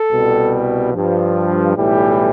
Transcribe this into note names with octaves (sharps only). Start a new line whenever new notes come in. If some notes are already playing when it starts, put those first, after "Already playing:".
Already playing: A4
C2 B2 G3
G2 F3
B1 A2 E3 G3 G4